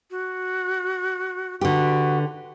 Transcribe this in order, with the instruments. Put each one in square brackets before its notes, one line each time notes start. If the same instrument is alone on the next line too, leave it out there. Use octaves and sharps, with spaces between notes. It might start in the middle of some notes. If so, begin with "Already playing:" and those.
[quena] F#4
[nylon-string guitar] D3 G4 [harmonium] F#4 [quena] B4